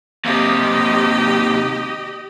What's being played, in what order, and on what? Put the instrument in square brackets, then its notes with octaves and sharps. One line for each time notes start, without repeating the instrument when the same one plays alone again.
[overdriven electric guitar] D#2 C3 [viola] G4 D#5